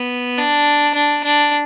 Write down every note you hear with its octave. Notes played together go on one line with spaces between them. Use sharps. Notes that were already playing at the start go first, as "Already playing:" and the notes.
Already playing: B3
D4
D4
D4